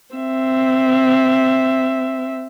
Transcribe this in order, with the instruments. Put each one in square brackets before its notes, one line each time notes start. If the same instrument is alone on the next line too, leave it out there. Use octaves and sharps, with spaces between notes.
[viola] C4 E5